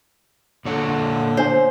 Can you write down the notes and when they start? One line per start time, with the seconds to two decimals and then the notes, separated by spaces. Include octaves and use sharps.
0.65 A#2 D3 C#5 F#5
1.37 D4 C5 C#5